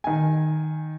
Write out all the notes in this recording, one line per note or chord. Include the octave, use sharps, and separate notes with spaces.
D#3 G#5